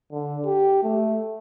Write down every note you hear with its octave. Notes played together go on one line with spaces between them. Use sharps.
D3
G4
A3